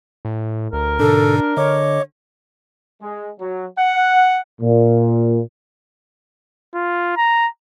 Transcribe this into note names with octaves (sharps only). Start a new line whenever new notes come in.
A2
D2 A#4
G#2 B2 D3 D4 A4
D3 C#5 D#5 D6
G#3
F#3
F#5
A#2
F4
A#5